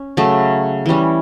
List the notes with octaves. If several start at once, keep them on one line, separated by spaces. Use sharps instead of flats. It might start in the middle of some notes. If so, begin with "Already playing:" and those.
Already playing: C#4
C#3 F#3 A3
E3 G3 C#4